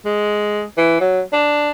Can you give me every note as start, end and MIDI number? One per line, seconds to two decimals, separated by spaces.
0.05 0.63 56
0.78 1.00 52
1.00 1.21 54
1.33 1.71 62